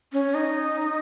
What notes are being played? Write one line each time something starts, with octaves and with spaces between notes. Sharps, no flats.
C#4
D#4